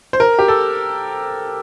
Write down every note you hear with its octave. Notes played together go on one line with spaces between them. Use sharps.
C5
A#4
G4
A4